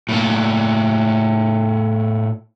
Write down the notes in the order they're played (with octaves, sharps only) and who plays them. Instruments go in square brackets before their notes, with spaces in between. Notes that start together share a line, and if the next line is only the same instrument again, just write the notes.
[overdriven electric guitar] A2 A#3